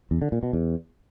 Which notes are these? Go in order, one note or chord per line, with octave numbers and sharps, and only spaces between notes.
E2
D3
A#2
B2
E2